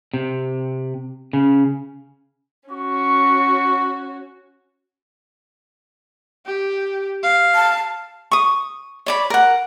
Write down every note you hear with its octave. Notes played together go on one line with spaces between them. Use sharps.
C3
C#3
C#4 F#4 C#6
G4
F5
A5
C#6 D#6
C#5 D5 B5
A#4 F#5